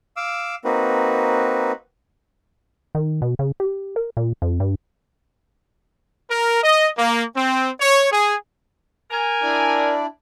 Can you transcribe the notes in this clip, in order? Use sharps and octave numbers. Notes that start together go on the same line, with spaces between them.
F5 D6 E6
A#3 C4 D#4 F#4 B4
D#3
B2
C#3
G4
A#4
A#2
F2
G2
A#4
D#5
A#3
C4
C#5
G#4
A#4 G#5
D4 E4 D5